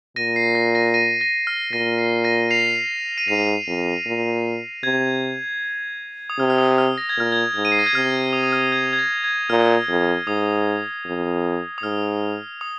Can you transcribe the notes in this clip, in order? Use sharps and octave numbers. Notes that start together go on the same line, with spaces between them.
A#2 A#6 D#7
C7
A#6
A#6 D#7
A#6 D#7
A#6 D#7
F6
A#2 A#6 D#7
C7
A#6 D#7
C7 F7
D#7
G#2 C7 F7
F2
A#2
C3 G#6
D#6
C3 F6
F6
D#6
F6
A#6
G#6
A#2 F6
G#6
G#2
D#7
C7
A#6
G#6
C3 F6
D#6
D#6
F6
G#6
G#6
A#6
G#6
A#2 F6
F2
G#2 D#6
F2
D#6
G#2 F6
D#6